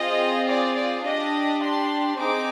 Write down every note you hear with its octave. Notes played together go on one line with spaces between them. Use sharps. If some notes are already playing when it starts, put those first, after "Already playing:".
Already playing: C4 F4 G#4 D#5
D5
D5
D4 G4 D#5
C6
C4 D#4 G#4 D6